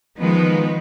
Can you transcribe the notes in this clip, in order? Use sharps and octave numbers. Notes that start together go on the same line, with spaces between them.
D#3 F3 G#3 B3 B4